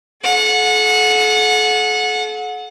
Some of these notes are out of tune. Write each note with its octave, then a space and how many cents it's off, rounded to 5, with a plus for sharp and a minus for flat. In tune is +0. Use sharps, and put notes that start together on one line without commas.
A4 -45 F#5 -25